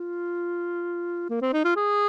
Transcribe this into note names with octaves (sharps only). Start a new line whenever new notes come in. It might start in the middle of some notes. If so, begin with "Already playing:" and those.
Already playing: F4
A#3
C4
D#4
F4
G#4